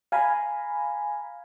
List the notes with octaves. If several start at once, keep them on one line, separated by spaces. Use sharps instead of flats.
F5 G#5 A#5 B5